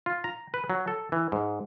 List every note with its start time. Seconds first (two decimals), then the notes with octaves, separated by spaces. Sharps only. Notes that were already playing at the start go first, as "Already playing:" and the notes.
0.06 F4
0.24 A#5
0.54 B4
0.70 F#3
0.88 A4
1.12 E3
1.32 G#2